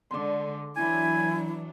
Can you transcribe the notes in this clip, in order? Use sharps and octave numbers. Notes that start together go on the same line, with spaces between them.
D3 G#3 D5 C6
E3 F#3 D4 E4 G#5